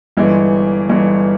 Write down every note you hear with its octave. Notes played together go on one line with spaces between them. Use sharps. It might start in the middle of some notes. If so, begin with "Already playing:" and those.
G1 G2 E3 G#3
G1 G2 E3 G#3